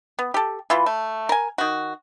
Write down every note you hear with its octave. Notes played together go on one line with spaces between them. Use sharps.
B3
G4 A4
E3 E4 F4
A3
A#4 G#5
D#3 F#4